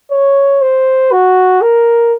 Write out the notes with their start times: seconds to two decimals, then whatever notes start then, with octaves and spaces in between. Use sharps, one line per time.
0.12 C#5
0.62 C5
1.12 F#4
1.62 A#4